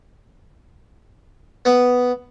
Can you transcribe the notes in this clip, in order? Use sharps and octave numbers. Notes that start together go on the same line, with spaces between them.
B3